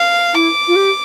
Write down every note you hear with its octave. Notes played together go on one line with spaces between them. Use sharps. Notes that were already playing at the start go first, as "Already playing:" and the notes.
Already playing: F5
E4 D6
F4
G4